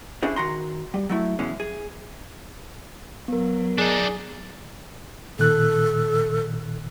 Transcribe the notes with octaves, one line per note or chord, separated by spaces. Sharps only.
C#4 D4 E4 G#4 C5
D#3 F#4 A#5 C6
G3
F#3 A3 E4
B2 E3 G#3 C#4
G#4
F#3 B3 A#4
D4 D#4 G#4
A#2 D#3 A4 F#6